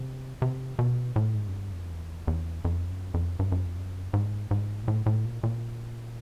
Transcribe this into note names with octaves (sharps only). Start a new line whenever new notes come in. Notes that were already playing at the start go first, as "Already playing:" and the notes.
Already playing: C3
C3
B2
A2
G#2
F#2
G2
F2
E2
E2
F2
F#2
F2
G2
F#2
F2
F#2
G#2
G#2
A#2
A2
A2
A#2
A#2